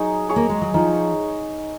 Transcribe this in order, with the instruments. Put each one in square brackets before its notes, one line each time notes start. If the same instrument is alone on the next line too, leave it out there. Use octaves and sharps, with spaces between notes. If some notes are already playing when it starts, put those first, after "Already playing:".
Already playing: [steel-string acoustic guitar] F#3 [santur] D#4 G#4 C#5
[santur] G#4 C#5
[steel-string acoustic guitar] A#3
G#3
F#3
[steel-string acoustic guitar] F3 [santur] D#4